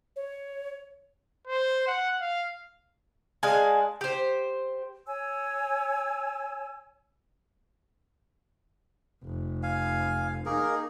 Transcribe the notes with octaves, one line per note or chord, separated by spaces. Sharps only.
C#5
C5
F#5
F5
G#3 D4 F5 G#5
G4 C5
C#5 G#5 E6
F1
F5 G#5
A#3 D#4 G#4 A#4